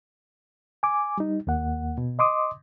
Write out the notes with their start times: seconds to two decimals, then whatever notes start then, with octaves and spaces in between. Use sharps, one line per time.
0.83 G#5 D6
1.18 G3 D#4
1.47 D#2 A#3 F#5
1.98 B2
2.19 D#5 C6 D6 D#6